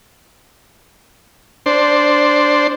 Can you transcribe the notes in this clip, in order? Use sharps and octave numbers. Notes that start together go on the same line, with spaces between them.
D4 C5